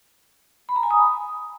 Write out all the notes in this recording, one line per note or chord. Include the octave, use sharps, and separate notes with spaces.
B5
A#5
G#5
D#6
B5